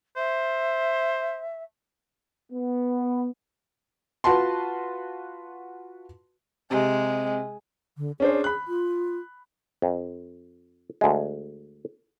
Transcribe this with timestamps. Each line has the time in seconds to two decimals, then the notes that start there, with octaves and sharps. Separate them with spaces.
0.17 C5 E5
2.53 B3
4.24 F4 F#4 B4 A5 C6
6.71 C3 G#3
7.98 D3
8.20 C#4 D4 G#4 C5
8.44 B5 F#6
8.68 F4
9.82 F2
11.01 D2 G#3